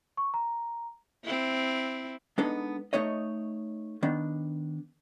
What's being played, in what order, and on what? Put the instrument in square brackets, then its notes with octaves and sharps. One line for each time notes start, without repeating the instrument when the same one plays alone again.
[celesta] C#6
A#5
[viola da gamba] C4 E4
[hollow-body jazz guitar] G#3 B3 D4 D#4 A4
A3 D#4 C#5 D#5
D#3 B3 D4